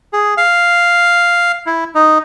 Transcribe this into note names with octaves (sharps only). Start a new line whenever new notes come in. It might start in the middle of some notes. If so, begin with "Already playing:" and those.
G#4
F5
E4
D#4